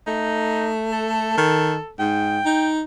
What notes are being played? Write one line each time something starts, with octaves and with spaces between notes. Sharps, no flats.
A3 D#4
A4
D#3
G#2 G5
D#4